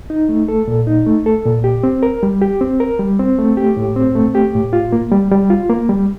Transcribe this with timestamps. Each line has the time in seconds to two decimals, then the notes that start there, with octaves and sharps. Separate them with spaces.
0.10 D#4
0.29 A3
0.48 A4
0.68 A#2
0.87 D#4
1.07 A3
1.26 A4
1.45 A#2
1.64 G4
1.83 C4
2.03 A#4
2.23 G3
2.42 G4
2.61 C4
2.80 A#4
2.99 G3
3.19 C4
3.38 A3
3.57 G4
3.77 A2
3.96 C4
4.15 A3
4.35 G4
4.54 A2
4.73 F4
4.92 A#3
5.11 G3
5.31 G3
5.50 F4
5.70 A#3
5.89 G3